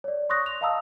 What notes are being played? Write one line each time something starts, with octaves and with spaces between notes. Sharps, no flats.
C#5 D5
C6 C#6 D#6 F#6 A#6
F7
D#5 F5 A5 A#5 D#6 E6